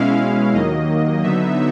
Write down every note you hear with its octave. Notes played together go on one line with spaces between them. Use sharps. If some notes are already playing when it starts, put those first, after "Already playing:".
Already playing: B2 G#3 C#4 E4 F5
D#2 D#3 F#3 A#3 D#5
D3 F#3 B3 D#4 E5